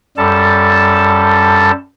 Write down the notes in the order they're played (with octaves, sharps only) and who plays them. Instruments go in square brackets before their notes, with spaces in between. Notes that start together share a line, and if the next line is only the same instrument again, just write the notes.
[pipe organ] F#2 G3 A4 A5